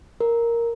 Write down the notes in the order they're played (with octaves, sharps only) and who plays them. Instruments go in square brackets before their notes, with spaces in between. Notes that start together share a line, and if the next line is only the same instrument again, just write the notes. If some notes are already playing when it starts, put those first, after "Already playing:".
[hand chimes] A#4